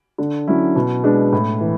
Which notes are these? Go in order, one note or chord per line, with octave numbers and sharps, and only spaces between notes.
D3
F#3 C#4 E4
B2
G#3 B3 D4
A2
E3